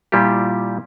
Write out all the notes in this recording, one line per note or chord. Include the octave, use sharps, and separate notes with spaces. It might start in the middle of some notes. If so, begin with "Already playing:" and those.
A#2 G3 E4 F4 G4